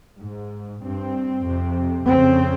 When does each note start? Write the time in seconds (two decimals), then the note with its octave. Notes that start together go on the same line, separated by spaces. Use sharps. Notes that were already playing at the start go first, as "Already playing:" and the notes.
0.20 G#2
0.82 G2 C4
1.44 F2 C3
2.06 F2 C#3 C4